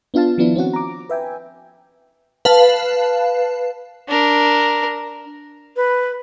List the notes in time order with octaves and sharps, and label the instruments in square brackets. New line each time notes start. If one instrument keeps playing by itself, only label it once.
[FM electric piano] B3 D4 F4 F5 A5
D#3 F3 B3 D4 E4
C4 C#4 F#4 F#5
A#5 D6
B4 E5 G5 G#5
[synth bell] B4 F5 A5
[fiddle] D4 A#4
[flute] B4